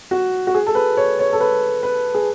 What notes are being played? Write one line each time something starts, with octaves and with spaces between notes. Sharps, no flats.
F#4
F#4
G#4
A4
B4
C#5
C#5
A4
B4
B4
G#4